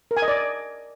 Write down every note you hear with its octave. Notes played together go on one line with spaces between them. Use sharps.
A#4
G#5
D#5
D5